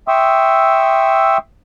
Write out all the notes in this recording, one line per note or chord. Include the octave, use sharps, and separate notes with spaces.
E5 G5 C6 C#6 D#6 E6